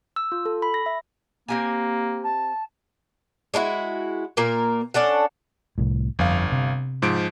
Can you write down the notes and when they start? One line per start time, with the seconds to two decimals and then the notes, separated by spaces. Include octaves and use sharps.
0.16 E6
0.32 F4
0.46 A4
0.62 B5
0.74 A#6
0.86 E5
1.48 A#3 C4 G4 G#5
2.23 A5
3.54 G#3 D4 E4 F#4
4.37 A#2 A#3 A#4
4.94 C#4 D4 A4 F#5
5.78 C2 A2
6.19 G1 F2 F5
6.52 C3
7.02 G#2 F3 D7